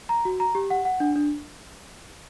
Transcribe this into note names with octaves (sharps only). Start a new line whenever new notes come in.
A#5
F#4
A#5
G4
F#5
F#5
D4
D4